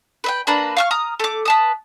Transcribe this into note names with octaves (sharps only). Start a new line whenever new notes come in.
B4 E5 G5
A#3 D4 B4 A#5
F5 C#6 F6
A#5 D#6 F6
A3 D6
B4 A5 D#6